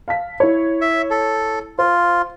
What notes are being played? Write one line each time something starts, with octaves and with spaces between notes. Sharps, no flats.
F5 A5 B6
E4 C#5
E5
A4
F4 C5